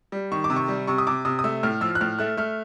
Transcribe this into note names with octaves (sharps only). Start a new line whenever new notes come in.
G3
D#3 C#6
D6
C3
C#6
G3
C3 C#6
D#6
C3 D6
C3 D#6
D#6
A3 E6
A2 F6
F3 E6
F#6
A2 F6
A3 F#6
A3 F6